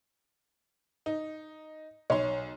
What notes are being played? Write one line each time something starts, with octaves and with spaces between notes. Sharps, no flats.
D#4
B1 C#5 C6